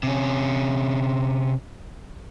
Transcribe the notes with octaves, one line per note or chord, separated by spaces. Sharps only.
C3 C#4